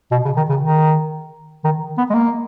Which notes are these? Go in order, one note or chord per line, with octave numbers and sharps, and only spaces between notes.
B2
C#3
D#3
C#3
D#3
D#3
B3
G#3
A#3